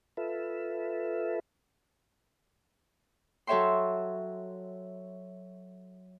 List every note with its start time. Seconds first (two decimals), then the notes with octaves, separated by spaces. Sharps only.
0.17 F4 A4 B4 E5
3.47 F#3 A4 C#5 E5 G5 C6